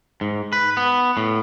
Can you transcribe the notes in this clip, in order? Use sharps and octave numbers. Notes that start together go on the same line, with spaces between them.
G#2
B4
B3
A2